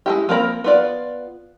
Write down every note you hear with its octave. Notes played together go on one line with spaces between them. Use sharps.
G#3 E4 G4
F3 A#3 C4 A#4 B5
B3 F4 D5